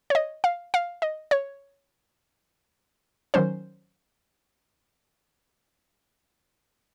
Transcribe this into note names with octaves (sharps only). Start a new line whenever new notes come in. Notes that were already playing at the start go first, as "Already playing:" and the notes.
C#5
D#5
F5
F5
D#5
C#5
D#3 F#3 C#4 C5